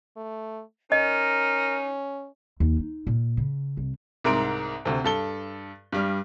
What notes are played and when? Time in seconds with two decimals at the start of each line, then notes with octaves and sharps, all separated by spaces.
0.16 A3
0.92 C#4 D#4 A#4 D#5
2.60 D#2
2.79 D#4
3.07 A#2
3.37 C#3
3.77 C2
4.24 C2 G#2 A#4 C6 D7
4.85 D2 C3
5.04 G2 A4 G7
5.92 G2 G3 F6